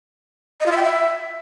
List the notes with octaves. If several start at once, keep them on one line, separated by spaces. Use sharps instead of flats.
D#5
F4
E5
G5
E5